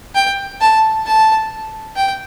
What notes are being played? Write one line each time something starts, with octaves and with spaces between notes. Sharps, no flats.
G5
A5
A5
G5